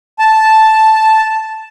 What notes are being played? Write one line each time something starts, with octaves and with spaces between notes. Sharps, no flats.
A5